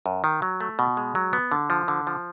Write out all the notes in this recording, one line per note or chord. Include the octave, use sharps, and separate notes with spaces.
F#2
D#3
F#3
A3
B2
G#3
F#3
B3
D3
F3
D3
F3